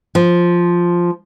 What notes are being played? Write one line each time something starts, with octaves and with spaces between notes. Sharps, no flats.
F3